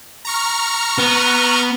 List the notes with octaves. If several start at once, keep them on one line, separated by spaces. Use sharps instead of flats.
A#5 C#6 F6
B3